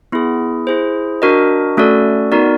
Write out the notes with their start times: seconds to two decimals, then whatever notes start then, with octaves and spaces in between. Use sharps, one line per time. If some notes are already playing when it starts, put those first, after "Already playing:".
0.12 B3 E4 G#4
0.67 E4 G#4 C5
1.22 D4 F#4 A#4 D#5
1.77 A3 C#4 F#4 A4 D5
2.32 B3 D#4 F#4 A#4 D5